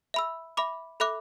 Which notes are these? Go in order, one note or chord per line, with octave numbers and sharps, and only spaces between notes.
E5 B5 E6
E5 B5 D6
A4 E5 B5 D6 F#6